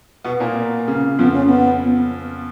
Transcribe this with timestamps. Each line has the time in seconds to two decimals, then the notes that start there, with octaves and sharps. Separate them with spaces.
0.24 B2 B3
0.40 A#2 A#3
0.88 C#3
1.19 F2 F3 B3
1.32 C#4
1.46 B3